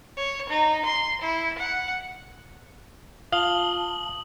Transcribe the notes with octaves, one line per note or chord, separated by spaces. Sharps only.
C#5
D#4
C6
E4
F#5
F4 F5 A5 D#6 F#7 G7